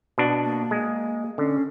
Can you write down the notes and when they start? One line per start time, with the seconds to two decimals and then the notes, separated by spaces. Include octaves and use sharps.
0.18 B2 D4 F#5
0.43 A#3
0.71 G#3
1.38 D3 C#4